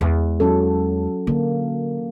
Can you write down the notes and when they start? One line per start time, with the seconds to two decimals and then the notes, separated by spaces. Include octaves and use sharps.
0.01 E2 G#3
0.40 F#3 C#4 A4
1.27 D3 A#3